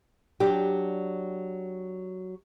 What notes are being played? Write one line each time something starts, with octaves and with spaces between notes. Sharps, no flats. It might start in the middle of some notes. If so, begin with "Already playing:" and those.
F#3 D4 G4